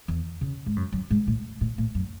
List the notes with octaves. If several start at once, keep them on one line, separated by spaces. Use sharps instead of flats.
E2
C#3
G#2
F#2
F#2
G#2
A2
A2
A2
F#2